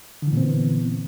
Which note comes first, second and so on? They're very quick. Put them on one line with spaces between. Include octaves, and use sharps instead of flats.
D3 E3 A#2 C4 B3